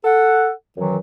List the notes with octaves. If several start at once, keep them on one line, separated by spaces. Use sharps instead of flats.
A4 F#5
F#2 D#3 E3 F#3